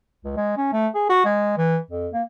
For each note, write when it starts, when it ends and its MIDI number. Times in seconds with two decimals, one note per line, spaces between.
0.24 0.34 37
0.37 0.55 56
0.57 0.70 61
0.72 0.88 57
0.94 1.07 68
1.09 1.24 66
1.25 1.53 56
1.58 1.78 52
1.91 2.08 41
2.13 2.23 58